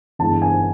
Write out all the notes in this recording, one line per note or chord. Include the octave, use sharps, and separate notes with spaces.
G1 G2 E3 G#3 A5
G#5